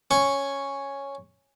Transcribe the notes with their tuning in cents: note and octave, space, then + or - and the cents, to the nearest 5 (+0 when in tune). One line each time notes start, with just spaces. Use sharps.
C#4 +0 C#6 +0